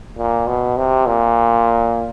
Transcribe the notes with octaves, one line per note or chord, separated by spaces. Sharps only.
A#2
B2
C3
A#2